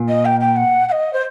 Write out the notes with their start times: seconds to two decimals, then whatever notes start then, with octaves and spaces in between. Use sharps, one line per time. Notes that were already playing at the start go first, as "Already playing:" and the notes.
Already playing: A#2
0.09 D#5
0.25 G5
0.40 G5
0.56 F#5
0.88 F#5
0.92 D#5
1.13 C5